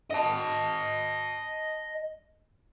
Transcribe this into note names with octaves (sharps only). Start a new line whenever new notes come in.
D#5 A5